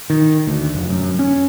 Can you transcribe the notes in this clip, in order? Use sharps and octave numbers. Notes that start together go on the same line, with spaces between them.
D#3
D2
F1
F#2
C#4